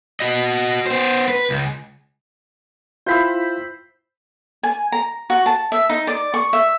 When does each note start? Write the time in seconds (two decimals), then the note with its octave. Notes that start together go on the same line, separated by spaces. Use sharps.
0.20 F#4 D#5
0.86 B3 C5
1.28 B4
1.50 C#2
3.06 E4 F4 C5 B5 E6
4.63 G#5
4.92 A#5
5.30 F#4
5.46 A5
5.72 E5
5.89 D#4
6.07 D5
6.34 C#6
6.53 E5